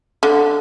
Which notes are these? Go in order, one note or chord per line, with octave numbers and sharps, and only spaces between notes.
D3